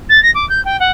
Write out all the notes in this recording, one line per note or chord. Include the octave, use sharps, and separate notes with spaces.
A6
A#6
D6
G6
G5
F#5